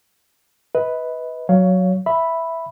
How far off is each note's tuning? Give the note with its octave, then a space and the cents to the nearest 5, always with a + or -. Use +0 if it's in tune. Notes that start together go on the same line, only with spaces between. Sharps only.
B4 +0 D#5 +40
F#3 +0 C#5 +15 F5 +0
E5 +0 B5 +0